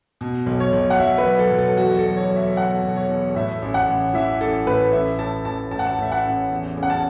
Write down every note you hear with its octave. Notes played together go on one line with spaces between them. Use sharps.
B2
B1
C#5
B1
F#5
F#3 E5
B4
F#3
A4
B1
A4
E2 F#4
A4
F#3
C#5
F#3
E5
B2 F#5
B2
C#5
E2
A2 E5
A1
F#5
A1
E3 E5
A1 A4
A2 B4
A1 E5
A2 A5
A1 A5
A2 A5
F#5
A5
A2 E5
F#5
A1
E2
C#3
F#5
A5